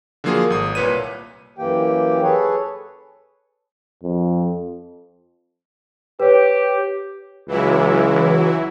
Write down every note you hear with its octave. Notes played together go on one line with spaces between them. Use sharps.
D3 F3 F#3 A#3 F4 G#4
G#1 D#6
C2 A#2 B4 C#5 D#7
F#2 E3 A#3 G4 G5
G#4 A4 B4 C#5
F2
G4 B4 C#5
C#2 E3 F#3 E4